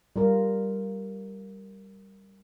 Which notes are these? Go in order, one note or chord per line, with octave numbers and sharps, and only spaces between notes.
G3 F4 A#4